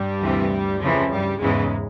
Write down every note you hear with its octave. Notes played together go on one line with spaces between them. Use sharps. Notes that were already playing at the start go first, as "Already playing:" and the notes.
Already playing: G2 G3
D2 C3 E3
F2 C#3 E3 F3
G2 G3
E2 G#2 C#3 E3 G#3